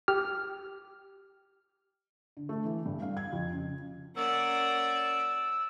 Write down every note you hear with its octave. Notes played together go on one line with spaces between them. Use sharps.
G4 F6
D3
A3
E3
G2
F5
G#6
F2
C#3
A#3 C#4 D5 F#5 E6